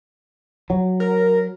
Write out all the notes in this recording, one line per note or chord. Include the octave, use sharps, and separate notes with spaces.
F#3
A#4